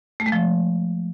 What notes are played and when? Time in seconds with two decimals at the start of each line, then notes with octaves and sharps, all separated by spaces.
0.20 A3
0.26 G#3
0.32 F3